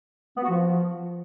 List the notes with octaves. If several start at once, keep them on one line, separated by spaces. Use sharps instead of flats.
B3
F#4
F3